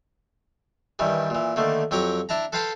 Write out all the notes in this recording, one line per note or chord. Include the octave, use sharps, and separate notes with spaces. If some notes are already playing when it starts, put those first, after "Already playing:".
G2 D#3 E3 G3
A#2 E3
D3 D#3 A3 A#3
F2 F#3 G4 C#5 A#5 D6
D4 E4 A5 A#5
A4 B4 C5 F5 G5 A5